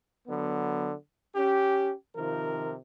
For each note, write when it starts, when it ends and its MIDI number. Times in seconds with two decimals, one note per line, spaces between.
0.27 0.92 50
0.27 0.92 54
0.27 0.92 59
1.35 1.92 61
1.35 1.92 67
2.16 2.76 48
2.16 2.76 51
2.16 2.76 53
2.16 2.76 65
2.16 2.76 70